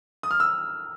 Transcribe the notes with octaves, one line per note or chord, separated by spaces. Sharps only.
D#6
F6
E6